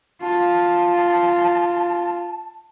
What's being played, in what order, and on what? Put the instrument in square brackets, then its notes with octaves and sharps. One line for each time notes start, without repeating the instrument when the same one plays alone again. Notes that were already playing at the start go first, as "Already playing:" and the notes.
[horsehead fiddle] F4 [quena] A5